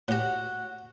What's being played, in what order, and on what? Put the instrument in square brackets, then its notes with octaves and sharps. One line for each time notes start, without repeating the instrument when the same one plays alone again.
[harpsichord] A2 G4 [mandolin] F#4 F#5